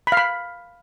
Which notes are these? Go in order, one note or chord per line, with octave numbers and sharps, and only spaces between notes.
B5
F5
B5